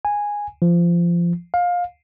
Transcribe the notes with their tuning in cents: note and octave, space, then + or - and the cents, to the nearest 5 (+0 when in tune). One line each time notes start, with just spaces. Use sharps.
G#5 -10
F3 -20
F5 +20